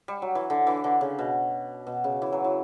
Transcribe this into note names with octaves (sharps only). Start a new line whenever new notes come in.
G3
F#3
E3
D3
E3
D3
C#3
B2
B2
C#3
E3
F#3
E3